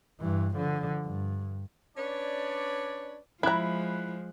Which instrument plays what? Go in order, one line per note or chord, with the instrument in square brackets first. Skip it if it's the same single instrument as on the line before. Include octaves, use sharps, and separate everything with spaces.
[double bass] G2 E3
D3 F3
G2
[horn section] C#4 D4 B4 C#5 D5
[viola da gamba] F3 G#3 [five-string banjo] E4 A#5 [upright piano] B5 F#6